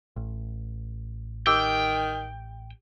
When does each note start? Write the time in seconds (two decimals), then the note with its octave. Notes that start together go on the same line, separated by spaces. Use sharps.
0.16 A1
1.47 D#3 G4 G5 D6 E6